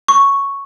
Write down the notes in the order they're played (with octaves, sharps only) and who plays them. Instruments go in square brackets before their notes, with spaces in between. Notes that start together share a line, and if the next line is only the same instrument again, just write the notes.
[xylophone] C#6